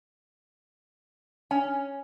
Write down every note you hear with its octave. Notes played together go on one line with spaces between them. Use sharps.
C#4 G#5